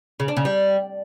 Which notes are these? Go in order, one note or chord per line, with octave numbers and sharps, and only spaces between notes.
C#3
D4
C#3
G3